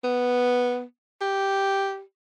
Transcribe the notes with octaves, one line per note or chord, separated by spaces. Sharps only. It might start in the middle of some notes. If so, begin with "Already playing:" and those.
B3
G4